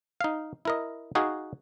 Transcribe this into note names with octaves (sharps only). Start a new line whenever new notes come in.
D#4 F5
E4 A#4 D#5
D#4 F#4 G#4 F5